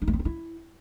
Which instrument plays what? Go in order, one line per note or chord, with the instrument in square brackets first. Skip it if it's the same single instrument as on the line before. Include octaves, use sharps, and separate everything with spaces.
[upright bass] D#4
G#3
C4
F4
E4